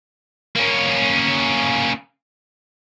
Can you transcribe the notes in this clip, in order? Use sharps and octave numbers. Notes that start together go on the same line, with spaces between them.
A#3 C#4